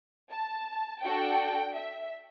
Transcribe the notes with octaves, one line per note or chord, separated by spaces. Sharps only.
A5
D4 F#4 A4 G5
E5